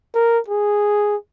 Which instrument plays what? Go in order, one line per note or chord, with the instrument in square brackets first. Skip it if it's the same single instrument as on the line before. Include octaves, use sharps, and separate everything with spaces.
[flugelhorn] A#4
G#4